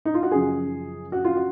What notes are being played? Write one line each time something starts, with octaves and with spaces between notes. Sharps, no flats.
D#4
F4
F#4
F#2 C#3 F3 G#4
F#4
F4
F#4